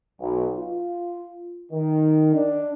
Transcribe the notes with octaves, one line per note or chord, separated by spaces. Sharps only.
B1
F4
D#3
D4